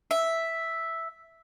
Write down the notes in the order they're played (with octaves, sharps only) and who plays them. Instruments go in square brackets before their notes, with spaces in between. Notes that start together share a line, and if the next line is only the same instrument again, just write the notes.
[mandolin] E5